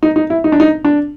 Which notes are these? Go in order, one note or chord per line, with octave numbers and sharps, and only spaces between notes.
D#4
D#4
E4
D#4
D4
D#4
D4